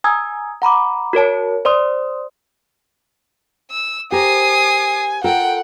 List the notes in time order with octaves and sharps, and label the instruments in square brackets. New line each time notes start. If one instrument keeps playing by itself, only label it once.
[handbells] G#5 A#5 D#6 E6 G#6
F#5 A#5 B5 D6
F#4 A#4 C#5 A5
C5 D5 C6 D#6
[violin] E6
[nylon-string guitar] G4 A#4 C5 [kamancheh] G#5 [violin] D#6 C7
[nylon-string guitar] F4 A4 A#4 [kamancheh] F#5 [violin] G5